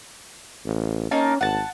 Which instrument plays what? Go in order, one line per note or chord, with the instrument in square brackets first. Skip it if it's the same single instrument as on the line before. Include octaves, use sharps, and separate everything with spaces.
[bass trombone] A1
[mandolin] A#3 D#4 A5 [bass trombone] C#4
[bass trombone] G#1 [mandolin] F#5 A5